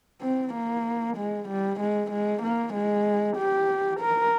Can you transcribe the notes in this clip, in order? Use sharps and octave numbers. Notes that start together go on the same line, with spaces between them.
C4
A#3
G#3
G3
G#3
G#3
A#3
G#3
G4
A#4